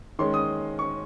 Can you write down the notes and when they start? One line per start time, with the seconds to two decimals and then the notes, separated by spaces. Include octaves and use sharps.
0.19 D#3 G#3 C#4 C6
0.34 D#6
0.79 C#6